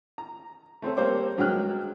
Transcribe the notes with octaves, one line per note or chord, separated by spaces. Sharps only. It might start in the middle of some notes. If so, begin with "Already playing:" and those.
A#5
A3 C4 C#4 A4
G3 A#3 C4 C5 C#5 D6
G2 F#3 G#3 G5 F6 F#6